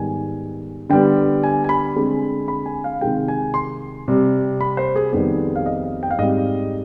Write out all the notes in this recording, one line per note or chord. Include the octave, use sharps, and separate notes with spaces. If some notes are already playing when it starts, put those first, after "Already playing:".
Already playing: G#2 D#3 G3 B3 G#5
D3 G3 B3 G5
G#5
G#5
B5
D3 G#3 C4
B5
G#5
F5
C3 D#3 G#3 G5
G#5
C6
C3 G3 C4
B5
C5
G#4
F2 D#3 G3 B3 G#4
F5
D#5
G5
F5
G#2 G3 C4 D#5